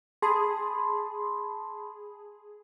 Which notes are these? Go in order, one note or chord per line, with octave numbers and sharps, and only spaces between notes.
G#4 A5 B5 C6